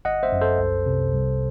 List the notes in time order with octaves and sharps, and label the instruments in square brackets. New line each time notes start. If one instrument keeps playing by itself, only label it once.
[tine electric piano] G1 D#5 F#5
C5 E5
F#2
A4 C5
C2
C3
C2